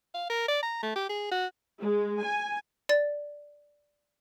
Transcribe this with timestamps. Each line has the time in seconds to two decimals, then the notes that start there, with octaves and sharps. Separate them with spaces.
0.14 F5
0.30 A#4
0.48 D5
0.63 A#5
0.83 A3
0.96 G4
1.09 G#4
1.31 F#4
1.80 G#3
2.22 G#5
2.89 D5 A6